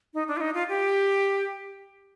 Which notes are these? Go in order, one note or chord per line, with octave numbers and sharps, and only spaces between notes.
D#4
D4
F4
D#4
F4
G4